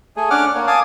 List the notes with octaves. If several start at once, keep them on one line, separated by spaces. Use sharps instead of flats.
A3 G#4
C#4 D4 F#5 D6 F6
A#3 C#5
F5 G#5 A5 D6 D#6